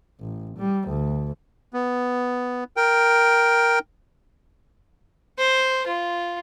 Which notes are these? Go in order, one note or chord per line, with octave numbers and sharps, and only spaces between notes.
A1
G3
D2
B3
A#4 G5
C5
F4